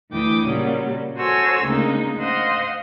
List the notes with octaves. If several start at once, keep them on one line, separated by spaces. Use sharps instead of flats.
D2 E3 G5 D6 D#6
A#2 C#3 F#3 G3
F#4 A4 C5 C#5 G#5 E6
D2 C#3 G#3 A#3 D#4
C5 D#5 F5 F#5 C6 D#6